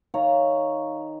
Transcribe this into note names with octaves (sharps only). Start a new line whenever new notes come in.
D#3 C#5 F5 A#5